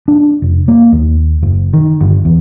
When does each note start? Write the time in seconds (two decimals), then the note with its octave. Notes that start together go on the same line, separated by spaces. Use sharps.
0.08 D4
0.42 F1
0.68 A#3
0.92 D#2
1.42 F#1
1.74 D#3
2.01 G1
2.25 E2